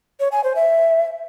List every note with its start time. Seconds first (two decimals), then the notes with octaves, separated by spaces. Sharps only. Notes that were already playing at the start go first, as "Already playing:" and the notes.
0.20 C#5
0.32 G#5
0.44 C5
0.55 E5